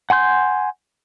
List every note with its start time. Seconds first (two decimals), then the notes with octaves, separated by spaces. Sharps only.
0.10 F#5 G#5 C6 G6